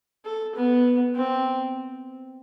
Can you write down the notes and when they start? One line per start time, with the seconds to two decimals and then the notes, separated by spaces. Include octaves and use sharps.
0.25 A4
0.55 B3
1.15 C4